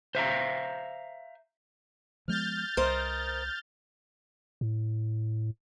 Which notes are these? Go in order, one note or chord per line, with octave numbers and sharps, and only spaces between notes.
C5 E5 F5 A#5
F3 G#3 B3 F6 G6 A6
C2 A#4 C5 D#5
A2